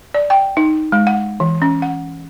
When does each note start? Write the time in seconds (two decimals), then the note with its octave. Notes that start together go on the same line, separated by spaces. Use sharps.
0.14 D5
0.30 G5
0.57 D#4
0.92 G#3
1.07 F#5
1.40 E3
1.62 C#4
1.82 F#5